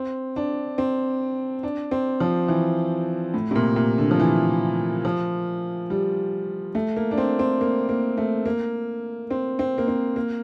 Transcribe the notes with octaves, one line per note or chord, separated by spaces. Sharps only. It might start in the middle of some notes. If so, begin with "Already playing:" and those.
Already playing: C4
D4
C4
D4
C4
F3
E3
A2
C3
A#2
A#2
D3
F3
E3
F3
G3
A3
A#3
D4
C4
C4
A#3
A#3
A3
A#3
C4
C4
A#3
C4
A#3